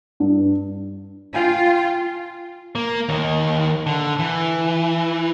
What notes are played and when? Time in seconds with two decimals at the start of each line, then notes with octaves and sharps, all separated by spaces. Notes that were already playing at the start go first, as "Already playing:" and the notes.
0.20 G2
1.34 F4 F5 G5 G#5
2.75 A#3
3.09 D#2 D#3
3.86 D3
4.19 E3